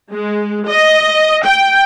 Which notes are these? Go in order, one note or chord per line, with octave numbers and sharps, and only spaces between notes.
G#3
D#5
G5